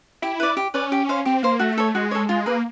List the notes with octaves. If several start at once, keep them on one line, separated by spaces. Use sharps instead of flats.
E4 G4
B4 D5
G4
C#4 B4 D5
G4
C5 F5
C4 G4
A#3 C5 F5
A3 F#4
A4 C#5
G#3 F#4
A4 C#5
G#3 F4
A#3 G#4 B4